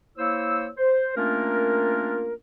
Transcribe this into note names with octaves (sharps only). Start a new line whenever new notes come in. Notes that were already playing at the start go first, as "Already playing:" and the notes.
A#3 E4 C5 C#5 E6
C5
A3 A#3 C#4 D4 F4 A#4